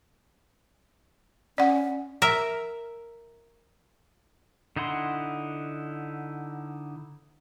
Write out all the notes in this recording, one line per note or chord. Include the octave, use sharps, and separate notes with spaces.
C#4 D5 F#5
A#4 E5
D3 D#4 E4 F#5 C6